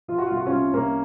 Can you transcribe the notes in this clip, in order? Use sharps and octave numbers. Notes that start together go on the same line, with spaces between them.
F3 F4
F#4
C2 F4
F#4
C#4 F4
C2
C2 A#3 C#4